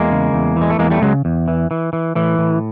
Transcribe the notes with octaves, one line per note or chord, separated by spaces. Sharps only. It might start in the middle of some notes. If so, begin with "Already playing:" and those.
Already playing: E2 G#3 A#3
C#3
E2
E3
G#3
A3
E2 G#3 A#3
G3 A3
C#3 F#3 G#3
E2
E3
E3
E3
A2 E3
A2